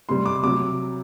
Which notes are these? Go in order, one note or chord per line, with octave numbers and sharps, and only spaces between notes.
C3 G3 C6
D6
C3 F#3 D6